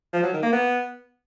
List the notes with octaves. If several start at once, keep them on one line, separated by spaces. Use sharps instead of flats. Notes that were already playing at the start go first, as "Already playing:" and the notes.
F3
F#3
D#3
A#3
B3